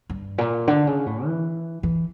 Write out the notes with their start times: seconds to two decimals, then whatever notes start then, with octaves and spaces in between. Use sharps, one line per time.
0.10 G2
0.38 A#2
0.67 D3
0.87 C#3
1.06 A2
1.26 E3
1.83 E3